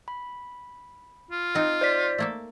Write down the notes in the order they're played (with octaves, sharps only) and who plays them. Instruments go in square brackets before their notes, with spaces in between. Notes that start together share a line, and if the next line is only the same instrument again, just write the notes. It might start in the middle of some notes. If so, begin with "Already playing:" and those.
[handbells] B5
[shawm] F4
[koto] C4 D#4
[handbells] C5 D5 B6
[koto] A3 A#3 A4